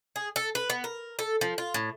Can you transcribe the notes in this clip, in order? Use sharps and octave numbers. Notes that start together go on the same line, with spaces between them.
G#4
A4
B4
B3
A#4
A4
F3
F4
A2